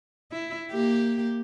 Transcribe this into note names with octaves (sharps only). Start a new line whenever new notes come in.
E4
A#3 G4